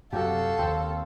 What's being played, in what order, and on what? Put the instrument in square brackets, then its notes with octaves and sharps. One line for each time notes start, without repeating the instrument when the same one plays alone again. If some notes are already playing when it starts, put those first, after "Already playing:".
[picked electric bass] F#2 C3 [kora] F#4 G4 [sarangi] A4 [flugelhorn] F5
[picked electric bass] D#2 [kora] C4